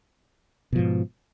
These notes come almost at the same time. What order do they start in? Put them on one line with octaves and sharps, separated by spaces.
B2 F3 G#2